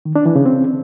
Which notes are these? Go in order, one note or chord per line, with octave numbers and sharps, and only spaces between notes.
D#3
D4
E3
C#3
C4